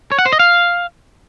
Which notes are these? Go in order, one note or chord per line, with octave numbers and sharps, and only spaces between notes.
C#5
F#5
C5
D#5
F5